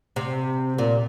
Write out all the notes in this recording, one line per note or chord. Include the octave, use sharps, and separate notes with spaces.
C3
A#2